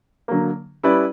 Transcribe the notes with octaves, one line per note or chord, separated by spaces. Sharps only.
D3 F#3 A#3
G3 C#4 E4 B4 D5